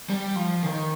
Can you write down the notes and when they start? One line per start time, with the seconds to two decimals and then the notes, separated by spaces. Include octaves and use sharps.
0.09 G3
0.36 F3
0.63 D#3